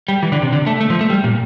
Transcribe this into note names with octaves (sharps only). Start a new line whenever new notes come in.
G3
E3
D3
C3
D3
A3
A3
F3
A3
G3
A#2